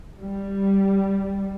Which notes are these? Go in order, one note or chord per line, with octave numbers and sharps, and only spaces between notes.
G3